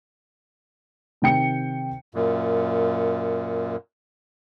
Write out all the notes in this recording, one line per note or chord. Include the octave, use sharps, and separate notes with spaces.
C3 D#3 G5 C#7
F#2 A#2